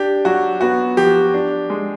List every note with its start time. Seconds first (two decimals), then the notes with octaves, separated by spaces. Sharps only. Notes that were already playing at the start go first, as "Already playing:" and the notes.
Already playing: D4 G4
0.25 F#3 F#4
0.61 B3 F#4
0.97 F3 G4
1.34 D4
1.70 G#3